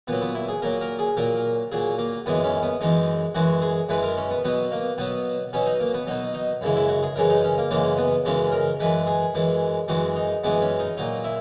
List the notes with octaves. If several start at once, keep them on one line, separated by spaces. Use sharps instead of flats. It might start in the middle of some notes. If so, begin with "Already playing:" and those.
A#2 F#3 B3
B3
E4
G#4
A#2 F#3 A#4
A#4
G#4
A#2 F#3 A#4
A#2 F#3 G#4
A#3
F#2 E3 G#3 B3
C#4
B3
F#2 E3 G#3 D#4
F#2 E3 G#3 F#4
G#4
F#2 E3 G#3 B4
A#4
C#4
B3
B2 F#3 B3
A#3
B2 F#3 B3
B2 F#3 C#4
D#4
A#3
B3
B2 F#3 D#4
D#4
F#2 C#3 E3 G#3
E4
F#4
G#4
F#2 C#3 E3 G#3 A#4
D#4
C#4
A#3
F#2 C#3 E3 G#3 A#3
B3
F#2 C#3 E3 G#3 C#4
A#4
F#2 E3 G#3 B4
G#4
F#2 E3 G#3
F#2 E3 G#3 F#4
D#4
F#2 E3 G#3 B3
C#4
D#4
A#2 F#3 D#4
E4